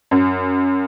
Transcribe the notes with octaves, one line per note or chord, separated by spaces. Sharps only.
F#2